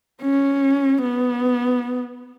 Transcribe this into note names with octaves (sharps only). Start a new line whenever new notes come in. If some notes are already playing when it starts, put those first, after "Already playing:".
C#4
B3